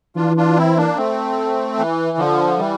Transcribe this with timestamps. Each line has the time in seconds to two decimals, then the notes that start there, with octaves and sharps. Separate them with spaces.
0.16 E3 D4 F4
0.37 D4 F4
0.57 C4 E4
0.77 A#3 D4
0.97 A3 C4
1.78 E3
2.18 D3 F3
2.59 E3 G3